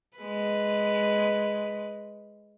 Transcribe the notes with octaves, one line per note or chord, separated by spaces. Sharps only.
G#3 B4